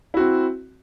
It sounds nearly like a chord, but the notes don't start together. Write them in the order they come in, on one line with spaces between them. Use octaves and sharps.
E4 F#4 C4